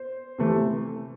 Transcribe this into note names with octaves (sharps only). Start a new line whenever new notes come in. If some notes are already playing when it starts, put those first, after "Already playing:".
Already playing: C5
C3 E3 A3